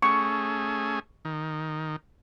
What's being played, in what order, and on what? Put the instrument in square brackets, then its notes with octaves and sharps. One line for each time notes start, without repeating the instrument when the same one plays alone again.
[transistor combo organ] A3 C#4 G#4 [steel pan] C#6
[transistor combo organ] D#3